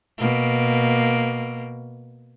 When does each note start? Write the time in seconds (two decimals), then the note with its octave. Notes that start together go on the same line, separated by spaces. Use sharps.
0.18 B2 A#3